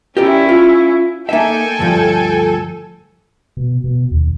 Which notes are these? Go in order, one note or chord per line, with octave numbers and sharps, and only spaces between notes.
C#4 E4 G4 A#4 D5
F4
A#3 D#4 A4 E5 G5 G#5
D2 G2 F3
B2
B2
D#2